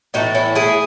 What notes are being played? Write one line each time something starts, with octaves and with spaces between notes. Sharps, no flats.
A2 E3 A3 D#4 F#4
C#4 E4
E4 G#4